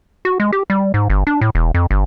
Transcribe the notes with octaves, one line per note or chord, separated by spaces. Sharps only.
F#4
G#3
G4
G3
G#2
G1
D4
A2
E1
F2
G1